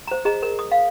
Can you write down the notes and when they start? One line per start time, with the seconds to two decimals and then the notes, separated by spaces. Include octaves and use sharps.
0.07 C5 A#5
0.25 G#4 D#5 A#5
0.43 A#4
0.59 D#6
0.71 F5